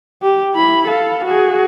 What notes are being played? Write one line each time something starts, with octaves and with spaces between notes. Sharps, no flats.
G4
E4 B5
A4 F5
F#4 G#4